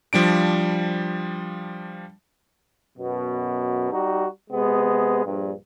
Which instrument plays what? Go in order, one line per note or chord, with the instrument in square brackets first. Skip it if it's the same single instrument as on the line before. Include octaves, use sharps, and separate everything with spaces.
[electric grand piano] F3 G3 D4 D7
[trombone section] F#2 B2
G3 D#4 F#4
C3 G#3 B3
A#1 G2